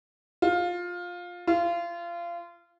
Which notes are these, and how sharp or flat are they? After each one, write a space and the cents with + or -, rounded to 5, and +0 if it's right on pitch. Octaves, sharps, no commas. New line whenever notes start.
F4 +15
F4 -25